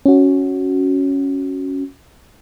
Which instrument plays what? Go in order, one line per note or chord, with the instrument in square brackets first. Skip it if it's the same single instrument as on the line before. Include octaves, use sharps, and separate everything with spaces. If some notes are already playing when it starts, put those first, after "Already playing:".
[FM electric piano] C#4 F#4